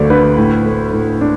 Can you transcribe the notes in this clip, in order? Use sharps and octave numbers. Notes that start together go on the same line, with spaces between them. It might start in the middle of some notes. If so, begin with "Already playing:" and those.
Already playing: D2 A3 D5
D3 B4
A2
A3
A2
D4